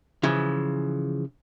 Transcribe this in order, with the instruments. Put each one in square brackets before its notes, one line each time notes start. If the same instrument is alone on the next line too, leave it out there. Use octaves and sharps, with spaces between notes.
[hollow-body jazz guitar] C#3 E3 F3